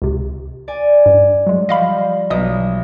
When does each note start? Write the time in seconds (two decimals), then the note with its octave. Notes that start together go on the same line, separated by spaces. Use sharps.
0.02 C#2 C3
0.68 D5 G#5
1.06 G2
1.47 F#3 G#3
1.69 F3 G3 D#5 F5 B5
2.30 B1 D#5 D#6